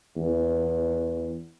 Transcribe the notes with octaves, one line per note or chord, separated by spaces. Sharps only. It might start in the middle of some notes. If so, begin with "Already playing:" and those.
E2